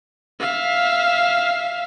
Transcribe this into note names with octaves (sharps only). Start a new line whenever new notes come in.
E5 F5